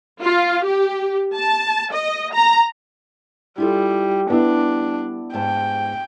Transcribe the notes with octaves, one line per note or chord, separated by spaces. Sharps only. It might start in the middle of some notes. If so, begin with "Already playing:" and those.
F4
G4
A5
D#5
A#5
G3 E4 F4 A4
G3 B3 D4 E4
G#2 G5 A5